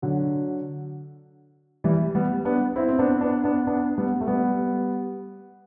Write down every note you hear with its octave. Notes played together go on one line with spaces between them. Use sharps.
D3 F#3
E3 G3
G3 B3
B3 D4
C4 E4
C4
B3 D4
B3 D4
B3 D4
B3 D4
G3 B3
A3
G3 B3